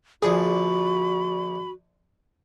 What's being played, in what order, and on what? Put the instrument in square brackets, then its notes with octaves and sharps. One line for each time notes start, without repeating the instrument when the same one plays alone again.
[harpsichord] A#1 D3 F3 [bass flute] F#4 [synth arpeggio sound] G#4 [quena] B5